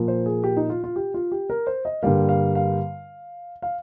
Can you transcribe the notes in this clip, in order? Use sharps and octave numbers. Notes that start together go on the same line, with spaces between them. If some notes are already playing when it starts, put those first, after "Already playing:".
Already playing: A#2 F3 A#3
C5
G#4
G4
D#4
F4
F4
G4
F4
G4
A#4
C5
D#5
G2 D3 G3 A#3 F5
F5
F5
F5